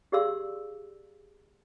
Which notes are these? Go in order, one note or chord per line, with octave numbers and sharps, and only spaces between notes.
G4 G#4 D5 F5 C6 E6